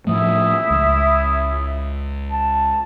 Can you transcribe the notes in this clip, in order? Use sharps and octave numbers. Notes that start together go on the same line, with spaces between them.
A2 F3 A3 E4 E5 D#6
C#2
A5